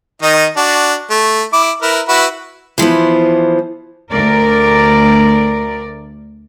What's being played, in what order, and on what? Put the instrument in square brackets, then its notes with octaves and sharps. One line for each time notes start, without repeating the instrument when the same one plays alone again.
[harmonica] D#3 D#4 D#5
D4 F#4
A3
E4 D6
E4 A#4 B4
E4 F#4 B4
[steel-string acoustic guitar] E3 F3 B3 C5
[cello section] D2 A#4 D5